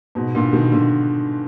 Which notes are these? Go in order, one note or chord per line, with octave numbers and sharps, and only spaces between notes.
G#2 B2
A#2 D3
B2 D#3
A#2 D3